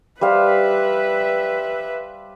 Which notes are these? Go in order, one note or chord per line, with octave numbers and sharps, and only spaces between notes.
G3 B4 C5 E5 F5